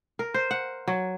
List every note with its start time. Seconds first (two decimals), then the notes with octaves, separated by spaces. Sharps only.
0.19 A#4
0.34 C5
0.51 F#5
0.87 F#3